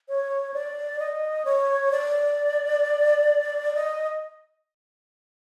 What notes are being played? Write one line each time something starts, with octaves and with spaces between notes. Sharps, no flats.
C#5
D5
D#5
C#5
D5
D#5